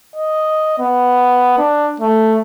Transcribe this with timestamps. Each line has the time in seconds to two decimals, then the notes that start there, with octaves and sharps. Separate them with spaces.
0.16 D#5
0.79 B3
1.59 D4
2.00 A3